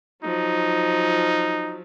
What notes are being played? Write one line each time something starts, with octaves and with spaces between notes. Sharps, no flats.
F3 F#3 D#4